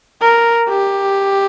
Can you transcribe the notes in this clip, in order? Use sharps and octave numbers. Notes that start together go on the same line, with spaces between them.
A#4
G4